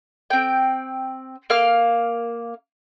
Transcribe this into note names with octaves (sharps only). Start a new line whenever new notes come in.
C4 G5
A#3 F5 F6